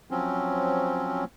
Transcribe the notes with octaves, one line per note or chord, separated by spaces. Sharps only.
F3 F#3 C4 C#4